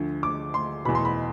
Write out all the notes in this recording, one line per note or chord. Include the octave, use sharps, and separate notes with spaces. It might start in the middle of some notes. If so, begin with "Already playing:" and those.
Already playing: D2 D3 F3
D6
C6
E2 B2 B5
C6
B5